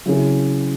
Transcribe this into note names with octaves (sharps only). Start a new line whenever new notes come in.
C#3 F#3 C#4 E4 G#4